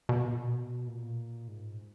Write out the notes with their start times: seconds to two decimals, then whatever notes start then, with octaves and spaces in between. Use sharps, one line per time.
0.09 B2
0.25 A#2
0.40 B2
0.87 A#2
1.48 G#2